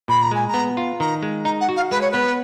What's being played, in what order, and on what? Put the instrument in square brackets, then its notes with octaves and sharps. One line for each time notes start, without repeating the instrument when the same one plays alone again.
[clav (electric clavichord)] A#2 [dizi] B5
[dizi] A#5
[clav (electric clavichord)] G#3 [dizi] G#5
[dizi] A#5
[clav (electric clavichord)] B3
F4
[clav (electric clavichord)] D#3 [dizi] A#5
[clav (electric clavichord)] G#3
[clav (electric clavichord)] D#4 [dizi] A#5
[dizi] F#5
[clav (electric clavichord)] F#4
[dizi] F5
[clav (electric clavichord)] G#3 [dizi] B4
[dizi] C#5
[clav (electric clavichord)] B3 [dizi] B4